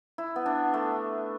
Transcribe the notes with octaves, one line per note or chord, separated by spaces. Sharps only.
E4
B3
D4
A3